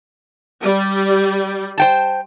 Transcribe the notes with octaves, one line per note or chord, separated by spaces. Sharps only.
G3
C5 G5 A5